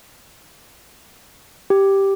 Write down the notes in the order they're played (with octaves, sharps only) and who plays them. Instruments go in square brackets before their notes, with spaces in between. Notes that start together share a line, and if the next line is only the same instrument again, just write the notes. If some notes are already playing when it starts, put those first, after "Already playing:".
[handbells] G4